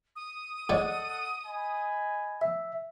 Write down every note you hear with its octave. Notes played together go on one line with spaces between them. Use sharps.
D#6
G#2 A4 C#5 D5 F#5
D#5 G#5 B5
E5